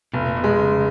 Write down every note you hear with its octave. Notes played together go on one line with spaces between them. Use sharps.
F1 B2
A#2
B2
G#3
C#3